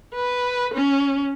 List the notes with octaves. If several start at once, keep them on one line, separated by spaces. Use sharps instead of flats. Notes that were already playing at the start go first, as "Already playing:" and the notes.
B4
C#4